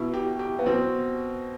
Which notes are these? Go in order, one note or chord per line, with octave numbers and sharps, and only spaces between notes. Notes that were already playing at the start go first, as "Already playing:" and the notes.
Already playing: B2 E4
G4
G4
B3
B2 C4